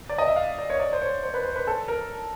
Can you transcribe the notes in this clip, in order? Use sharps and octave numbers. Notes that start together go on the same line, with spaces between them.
D5
D#5
E5
F5
D5
C#5
D5
C5
C#5
C5
B4
C5
B4
A4
A#4